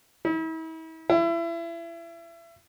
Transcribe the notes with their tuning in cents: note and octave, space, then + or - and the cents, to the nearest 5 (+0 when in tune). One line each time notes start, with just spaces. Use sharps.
E4 -40
E4 +30